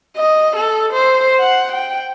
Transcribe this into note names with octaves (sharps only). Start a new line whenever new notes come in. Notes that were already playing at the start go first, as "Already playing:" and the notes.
D#5
A4
C5
F#5
G5